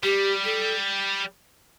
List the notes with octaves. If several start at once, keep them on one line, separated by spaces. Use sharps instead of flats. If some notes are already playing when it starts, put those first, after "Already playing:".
G3 G4
A4